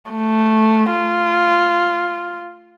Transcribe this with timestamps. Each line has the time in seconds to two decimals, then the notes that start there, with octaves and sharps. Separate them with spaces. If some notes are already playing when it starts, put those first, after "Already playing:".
0.11 A3
0.92 F4